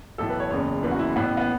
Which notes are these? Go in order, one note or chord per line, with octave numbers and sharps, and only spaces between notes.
B1 A2 E3 A4
B4
C#5
F#1 E2 C#3 C#5
F#1 E2 C#3 E3 B4
F#4
E4
A1 A2 E3 B3
B3